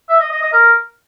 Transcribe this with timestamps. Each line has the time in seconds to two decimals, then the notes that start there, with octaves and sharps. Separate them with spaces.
0.09 E5
0.20 D#5
0.31 D#5
0.42 D#5
0.53 A#4